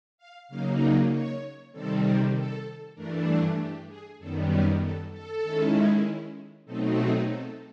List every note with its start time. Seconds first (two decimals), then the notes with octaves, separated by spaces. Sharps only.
0.18 F5
0.48 C#3 F#3 A#3 D#4 F5
0.79 D5
1.10 C#5
1.72 C3 D#3 G3 C4 A4
2.33 A4
2.95 G2 E3 A3 D4 A#4
3.26 A4
3.57 G4
3.88 G#4
4.18 F#2 D#3 G3 B3 A4
4.49 A#4
4.81 A4
5.11 A4
5.42 D#3 G#3 C#4 E4
6.65 B2 F#3 A3 C4 D#4 A4
6.96 G#4
7.27 A4